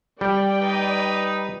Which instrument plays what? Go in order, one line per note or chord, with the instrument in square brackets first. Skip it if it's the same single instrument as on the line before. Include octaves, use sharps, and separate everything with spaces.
[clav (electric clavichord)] G3 [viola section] D5 G5
[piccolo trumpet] D#4 [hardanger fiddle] B4